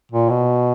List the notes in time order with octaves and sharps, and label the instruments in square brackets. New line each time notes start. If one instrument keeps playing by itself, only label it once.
[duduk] A#2
B2